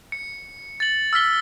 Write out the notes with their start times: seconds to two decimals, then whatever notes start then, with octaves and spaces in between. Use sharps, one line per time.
0.12 C#7
0.80 A6 F#7
1.13 E6 F6 B6 G7